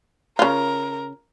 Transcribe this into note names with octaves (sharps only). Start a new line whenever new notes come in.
C#3 F4 A#4